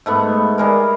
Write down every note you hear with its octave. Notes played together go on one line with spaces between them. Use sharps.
G#2 A3 B3
G3 G#3 A#4